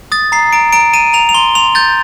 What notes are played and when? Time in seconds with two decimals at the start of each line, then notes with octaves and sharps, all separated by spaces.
0.12 D#6 A6
0.32 A#5 C7
0.53 A#5 D7
0.73 A#5 D7
0.93 A#5 D#7
1.13 A#5 F7
1.29 F7
1.34 C6 G7
1.55 C6 F7
1.75 G6 A6